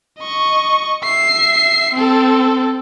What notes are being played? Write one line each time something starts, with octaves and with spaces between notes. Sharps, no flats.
D#5 C#6
E5 C7
C4 A4